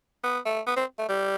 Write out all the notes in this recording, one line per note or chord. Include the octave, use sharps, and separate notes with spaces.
B3
A3
B3
C4
A3
G3